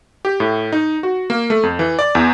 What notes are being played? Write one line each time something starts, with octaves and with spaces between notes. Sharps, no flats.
G4
A2
D#4
F#4
A#3
A3
F2
E3
D5
E2